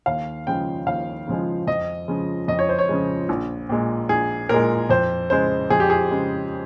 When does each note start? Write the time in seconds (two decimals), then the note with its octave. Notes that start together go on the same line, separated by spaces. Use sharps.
0.06 D#2 F5
0.47 C#3 F3 G#3 G5
0.86 D#2 F5
1.27 C#3 F3 G#3
1.67 F2 D#5
2.08 C#3 F3 G#3
2.48 F2 D#5
2.59 C#5
2.69 C5
2.79 C#5
2.89 C#3 F3 G#3
3.29 A#1
3.69 A#2 G#3
4.09 A#1 G#4
4.49 A#2 G#3 A#4
4.89 F2 C5
5.30 C#3 G#3 C5
5.70 F2 G#4
5.80 G4
5.90 G#4
6.11 C#3 G#3